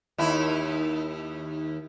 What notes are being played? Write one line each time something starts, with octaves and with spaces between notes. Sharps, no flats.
D#2 E4